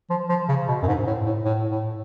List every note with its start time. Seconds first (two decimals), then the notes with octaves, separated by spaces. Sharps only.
0.10 F3
0.29 F3
0.49 C#3
0.68 B2
0.83 F#2
0.88 G#2
1.07 A2
1.26 A2
1.45 A2
1.71 A2